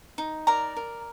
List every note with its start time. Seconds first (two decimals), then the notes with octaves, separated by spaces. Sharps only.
0.18 D#4
0.47 A#4 D5 A#5
0.76 A#4